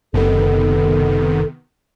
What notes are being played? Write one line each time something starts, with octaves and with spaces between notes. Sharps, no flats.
F#1 C3 D#3 B3 A4